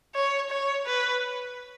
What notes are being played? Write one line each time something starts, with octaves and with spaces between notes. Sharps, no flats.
C#5
C#5
B4